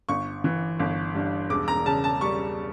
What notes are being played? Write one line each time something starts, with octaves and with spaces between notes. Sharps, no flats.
G1 C#6
E3
G1
G2
E1 D6
A#5
C#3 A5
A5
G3 C#6